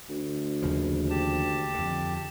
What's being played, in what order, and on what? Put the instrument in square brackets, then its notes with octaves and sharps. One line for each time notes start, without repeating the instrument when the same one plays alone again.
[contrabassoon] D2
[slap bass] D#2 C#3 F3
[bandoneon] G4 A5
[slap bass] F2 D3